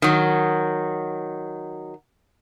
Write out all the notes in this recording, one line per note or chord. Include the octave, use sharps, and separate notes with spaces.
D#3 F#3